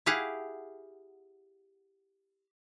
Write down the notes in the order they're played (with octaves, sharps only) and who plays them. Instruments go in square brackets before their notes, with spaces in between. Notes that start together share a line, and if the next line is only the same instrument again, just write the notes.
[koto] E4 G4 G#4 F5 F#5